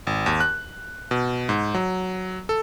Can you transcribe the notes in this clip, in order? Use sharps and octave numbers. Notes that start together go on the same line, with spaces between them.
G#1
D#2
F#6
B2
G#2
F#3
A4